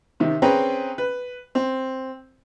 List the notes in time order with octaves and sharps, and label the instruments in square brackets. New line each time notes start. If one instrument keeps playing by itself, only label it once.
[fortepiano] C3 D#3
C4 C#4 G#4 B4 G5 A#5
B4
C4